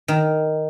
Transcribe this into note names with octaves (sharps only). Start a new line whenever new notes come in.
D#3